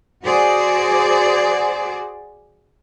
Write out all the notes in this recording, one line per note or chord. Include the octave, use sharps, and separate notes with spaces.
F#4 G#4 C5 D5